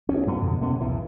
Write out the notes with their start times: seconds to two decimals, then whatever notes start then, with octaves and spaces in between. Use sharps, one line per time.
0.09 D2 C#4
0.27 G2 F#3 B3
0.41 F2 B2 D3
0.61 B2 A#3 B3 C#4
0.80 B1 E2 A2 E3